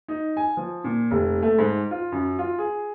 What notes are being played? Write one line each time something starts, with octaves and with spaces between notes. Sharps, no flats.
D#4
G#5
F3
A#2
F1
A3
G#2
F4
F#2
F4
G#4